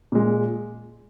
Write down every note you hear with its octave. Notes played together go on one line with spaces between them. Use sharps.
A#2 G#3